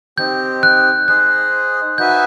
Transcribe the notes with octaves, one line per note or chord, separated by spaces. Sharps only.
C4 D#4 G4 G6
F#6
D#4 G#4 C5 D#5 F#6
D#4 F#4 B4 E5 G#5 G6
F#6